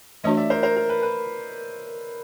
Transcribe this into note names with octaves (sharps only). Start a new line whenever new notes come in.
E3 A3 D4 F#4 C#5 D#5
D5 E5
A#4 C5
A#4 C5
A#4
B4
B4